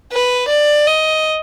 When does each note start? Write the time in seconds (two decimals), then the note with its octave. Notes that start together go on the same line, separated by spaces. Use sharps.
0.12 B4
0.49 D5
0.87 D#5